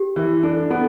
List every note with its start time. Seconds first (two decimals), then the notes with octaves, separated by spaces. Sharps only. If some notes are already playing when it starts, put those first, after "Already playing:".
Already playing: G4
0.16 E3
0.43 D4 A4
0.70 B3 A4